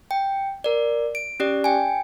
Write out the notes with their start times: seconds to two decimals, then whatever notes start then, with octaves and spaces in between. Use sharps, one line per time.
0.11 G5
0.64 A#4 D5
1.15 D7
1.40 C#4 G4 D5
1.64 G5 G#5